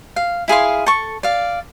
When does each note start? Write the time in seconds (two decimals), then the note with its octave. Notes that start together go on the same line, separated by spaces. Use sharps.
0.16 F5
0.48 E4 G#4 F5 C6
0.86 A4 C#6
1.23 D5 F5